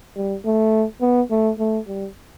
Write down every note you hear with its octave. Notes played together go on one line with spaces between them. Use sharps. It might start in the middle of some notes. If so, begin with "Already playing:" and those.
G3
A3
B3
A3
A3
G3